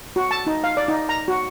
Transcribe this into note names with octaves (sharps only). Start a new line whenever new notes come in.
F#4
A5
D#4
F5
D5
D#4
A#5
F#4